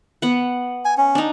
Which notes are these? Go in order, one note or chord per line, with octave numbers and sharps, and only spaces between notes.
B3 F#5
G#5
C#4
D4 D#4